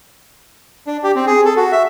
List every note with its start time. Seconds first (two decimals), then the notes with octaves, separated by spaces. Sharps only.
0.87 D4
1.04 G4
1.16 C4
1.27 G#4
1.45 A4
1.57 F#4
1.72 E5